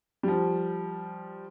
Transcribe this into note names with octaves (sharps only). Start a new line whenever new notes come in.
F3 G3